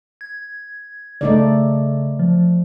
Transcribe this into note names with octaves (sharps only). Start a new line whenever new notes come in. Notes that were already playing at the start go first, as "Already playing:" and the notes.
G#6
C#3 A3 D#4 D5
F3